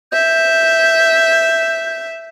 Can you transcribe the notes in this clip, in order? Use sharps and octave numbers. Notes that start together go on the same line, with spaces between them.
E5 G6